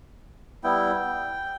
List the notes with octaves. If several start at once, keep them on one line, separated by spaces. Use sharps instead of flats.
G3 B3 E4 G5